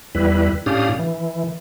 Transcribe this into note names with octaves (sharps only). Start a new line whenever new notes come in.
E2 G3 E4 B4
A2 C#4 D4 G4 F5 D#6
E3